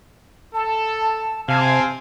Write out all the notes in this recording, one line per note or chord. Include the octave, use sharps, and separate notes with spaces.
A4 A5
C3 C4 F5 G#5 A5